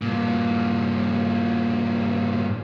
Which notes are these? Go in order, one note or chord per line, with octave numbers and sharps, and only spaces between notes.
G2 A#2